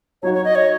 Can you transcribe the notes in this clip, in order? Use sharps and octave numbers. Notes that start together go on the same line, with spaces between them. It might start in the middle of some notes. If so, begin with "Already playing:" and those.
F#3 D#4 F#4 C#5
C#5
D#5
C#5